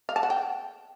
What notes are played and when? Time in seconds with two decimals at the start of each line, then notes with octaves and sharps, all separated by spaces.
0.09 F5
0.16 A5
0.23 F#5
0.30 G5